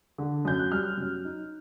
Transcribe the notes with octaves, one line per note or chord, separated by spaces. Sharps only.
D3
F#2 G6
F#6
G3 F6
F#2
D#4